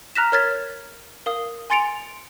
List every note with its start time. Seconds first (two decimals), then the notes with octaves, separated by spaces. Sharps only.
0.15 A#5 F6 F#6 A#6 B6 E7
0.32 A#4 C#5 F6 G#6 A6 B6
1.26 A#4 F5 D#6
1.70 G#5 C6 A6 C#7 D7 F7